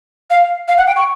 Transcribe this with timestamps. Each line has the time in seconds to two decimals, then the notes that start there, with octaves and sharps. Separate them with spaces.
0.30 F5
0.68 F5
0.78 F#5
0.87 G5
0.96 C#6